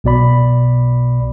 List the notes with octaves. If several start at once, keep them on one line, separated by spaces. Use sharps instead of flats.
B1 B2 D5 B5